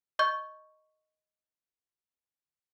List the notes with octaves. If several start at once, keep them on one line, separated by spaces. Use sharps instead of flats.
D#5 C#6 G6